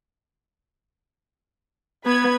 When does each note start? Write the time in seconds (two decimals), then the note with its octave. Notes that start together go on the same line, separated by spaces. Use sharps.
2.06 B3 B4 B5 G#6